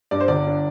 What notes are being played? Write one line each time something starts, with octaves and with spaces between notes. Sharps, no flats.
G2 D5
C5
G1 D5
D4